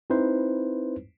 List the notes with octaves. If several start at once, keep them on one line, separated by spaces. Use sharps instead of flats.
C4 D#4 E4 B4 C5